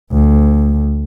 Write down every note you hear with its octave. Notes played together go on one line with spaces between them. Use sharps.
D2